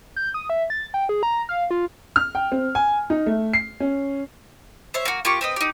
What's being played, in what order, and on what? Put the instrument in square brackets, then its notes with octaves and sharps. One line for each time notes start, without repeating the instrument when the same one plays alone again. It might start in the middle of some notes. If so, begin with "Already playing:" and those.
[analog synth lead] G6
D#6
E5
A6
G5
G#4
A#5
F5
F4
[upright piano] F6
G5
C4
G#5
D#4
A3
C7
C#4
[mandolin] C5 C#5 E5
A#3 F#4
A#3 F4 G4 C#6
C4 B4 D#5
D#4 G4